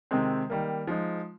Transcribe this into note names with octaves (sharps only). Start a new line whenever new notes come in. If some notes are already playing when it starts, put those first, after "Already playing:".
C3 D#3 G#3 C4
D#3 G3 A#3
F3 G#3 D#4